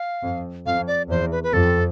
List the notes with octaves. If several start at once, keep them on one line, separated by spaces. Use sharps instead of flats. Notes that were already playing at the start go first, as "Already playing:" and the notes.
Already playing: F5
F2
F2 F5
D5
E2 C5
B4
B4
F2 A4